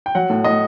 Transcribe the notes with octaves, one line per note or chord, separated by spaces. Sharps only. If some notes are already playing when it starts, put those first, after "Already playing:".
G5
F#3 F#5
A2
A2 D#5